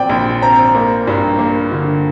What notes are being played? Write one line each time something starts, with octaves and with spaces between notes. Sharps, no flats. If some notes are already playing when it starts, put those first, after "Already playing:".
Already playing: A#2 C4 D5 G5
A#1
C4 A#5
A#3
G2
A#3
D3